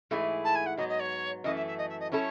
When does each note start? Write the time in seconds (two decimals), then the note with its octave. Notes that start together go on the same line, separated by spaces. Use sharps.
0.11 G#2 E3 A3 E4 G#4
0.44 A5
0.55 G#5
0.66 F#5
0.77 G#2 F#3 B3 D#5
0.89 D#5
1.00 C#5
1.44 F#2 E3 A3 D#5
1.56 E5
1.66 E5
1.78 D#5
1.89 E5
2.00 D#5
2.12 F#3 C#4 E4 A4 C#5